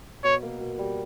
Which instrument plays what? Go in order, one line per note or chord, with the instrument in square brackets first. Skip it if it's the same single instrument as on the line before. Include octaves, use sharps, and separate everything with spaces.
[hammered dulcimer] B2 [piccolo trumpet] C#5
[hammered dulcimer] A#3
B2
G3